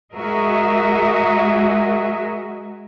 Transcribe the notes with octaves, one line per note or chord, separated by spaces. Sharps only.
G#3 F#4 G#4 A#4 D#5 E5